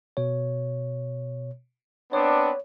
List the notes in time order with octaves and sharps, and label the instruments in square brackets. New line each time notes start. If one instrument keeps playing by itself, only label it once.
[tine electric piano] B2 C#5
[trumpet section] B3 C4 D4 [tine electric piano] C#5